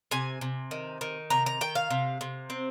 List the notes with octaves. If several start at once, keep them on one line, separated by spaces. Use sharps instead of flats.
C3 G#5
C3
D#3
D#3
C3 A#5
A#5
D#3 G5
F5
C3
C3
C4